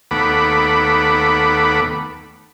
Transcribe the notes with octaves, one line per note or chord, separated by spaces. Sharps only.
D#2 A3 B3 F#5 B5 D6